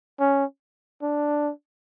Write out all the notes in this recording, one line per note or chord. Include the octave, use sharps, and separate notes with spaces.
C#4
D4